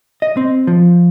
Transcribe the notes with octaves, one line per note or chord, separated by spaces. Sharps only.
D#5
C4
F3